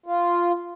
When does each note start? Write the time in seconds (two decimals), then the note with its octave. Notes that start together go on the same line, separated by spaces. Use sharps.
0.06 F4